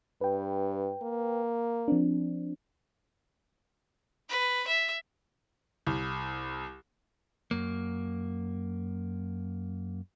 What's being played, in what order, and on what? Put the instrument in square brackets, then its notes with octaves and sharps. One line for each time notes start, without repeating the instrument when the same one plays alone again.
[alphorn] G2 [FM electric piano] B4 G5
[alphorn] A#3
[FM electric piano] F3 C4 D4
[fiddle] B4
E5
[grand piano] C2
[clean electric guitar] F#2 A#3